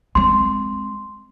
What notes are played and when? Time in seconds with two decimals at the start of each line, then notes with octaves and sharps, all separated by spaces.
0.15 G#3 C4 C6